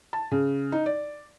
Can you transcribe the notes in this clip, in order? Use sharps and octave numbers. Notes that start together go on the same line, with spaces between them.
A5
C#3
D#4
D5